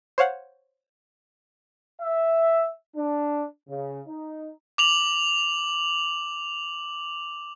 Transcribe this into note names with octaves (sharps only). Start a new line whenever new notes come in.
C5 C#5 F5 F#5
E5
D4
C#3
D#4
D6 F7 F#7